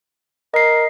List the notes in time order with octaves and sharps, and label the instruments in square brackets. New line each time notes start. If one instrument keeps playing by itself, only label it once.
[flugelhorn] A#4 [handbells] D#5 C7